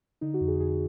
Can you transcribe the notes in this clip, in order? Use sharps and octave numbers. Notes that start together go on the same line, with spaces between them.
D3 D#4
F#4
F2
G#4
F2 G#4